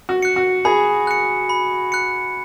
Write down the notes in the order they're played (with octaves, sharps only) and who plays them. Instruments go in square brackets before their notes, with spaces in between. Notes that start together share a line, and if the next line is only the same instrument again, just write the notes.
[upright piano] F#4
[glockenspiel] F#6 C#7
[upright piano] F#4
[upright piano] G#4 [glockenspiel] B5
[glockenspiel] F#6 C#7
B5
F#6 C#7